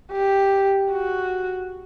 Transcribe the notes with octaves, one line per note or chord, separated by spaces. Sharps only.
G4
F#4